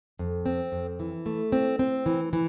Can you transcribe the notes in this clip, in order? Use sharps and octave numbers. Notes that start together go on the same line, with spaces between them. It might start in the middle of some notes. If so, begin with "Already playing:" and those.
F2
C4
F2
E3
A3
C4
C4
E3
E3